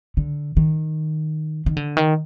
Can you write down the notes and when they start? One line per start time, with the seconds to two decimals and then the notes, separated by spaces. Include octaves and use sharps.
0.17 D3
0.57 D#3
1.66 D#3
1.77 D3
1.97 D#3